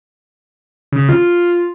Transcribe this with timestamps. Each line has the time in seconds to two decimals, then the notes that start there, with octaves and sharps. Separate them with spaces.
0.92 C#3
1.09 F4